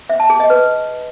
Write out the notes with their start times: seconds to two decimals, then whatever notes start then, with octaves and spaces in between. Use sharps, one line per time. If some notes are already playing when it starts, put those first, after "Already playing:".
0.10 E5
0.20 A5
0.30 G#4
0.40 D#5
0.50 B4